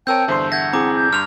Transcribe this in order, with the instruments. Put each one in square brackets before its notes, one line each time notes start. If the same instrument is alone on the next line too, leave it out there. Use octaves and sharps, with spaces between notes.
[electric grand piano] C4 A#4 C#5 [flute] G5 [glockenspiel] A5 E6 G6
[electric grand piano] E2 G2 D3 [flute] C5 [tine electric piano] E5 C6
[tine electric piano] E5 [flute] F#5 [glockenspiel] G6 G#6 A#6
[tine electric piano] C4 E4 G#4 [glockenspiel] A#5 D6
[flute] G6
[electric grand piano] G2 C6 [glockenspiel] F6 F7